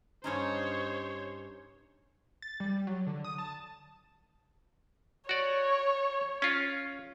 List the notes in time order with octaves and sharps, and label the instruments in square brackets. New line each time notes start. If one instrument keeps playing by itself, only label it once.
[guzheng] G2 C#4 D#4 [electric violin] C5 C#5
[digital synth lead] A6
G3
F#3
D3
D#6
A5
[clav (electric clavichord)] F#4 D5 [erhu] C#5
[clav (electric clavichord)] C#4 F4